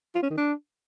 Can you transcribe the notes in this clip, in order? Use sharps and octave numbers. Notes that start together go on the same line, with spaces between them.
F4
C#4
D#3
D4